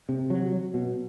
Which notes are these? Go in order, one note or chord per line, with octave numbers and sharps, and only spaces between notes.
C3
F#3
F#3
B2